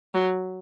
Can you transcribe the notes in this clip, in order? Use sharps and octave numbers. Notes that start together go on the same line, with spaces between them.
F#3